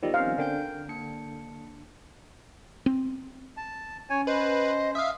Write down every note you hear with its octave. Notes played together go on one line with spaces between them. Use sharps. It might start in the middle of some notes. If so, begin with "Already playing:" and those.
D#3 F3 G3 B3 D5 D#5
C4 C#4 C5 F5
D3 A#4 G5 G6
A#3 D4 C#7
C4
A5
C#4 C#5 G#5
B4 C5 D#5
E5 F5 D#6